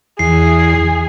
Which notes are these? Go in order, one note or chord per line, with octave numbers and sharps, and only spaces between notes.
E2 G#4 C7